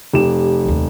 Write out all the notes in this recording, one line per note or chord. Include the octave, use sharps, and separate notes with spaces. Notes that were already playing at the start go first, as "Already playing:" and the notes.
F1 G4 E7
A#1 D#2